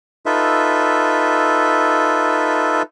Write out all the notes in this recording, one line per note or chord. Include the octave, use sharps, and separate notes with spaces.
D#4 F4 A4 B4 E5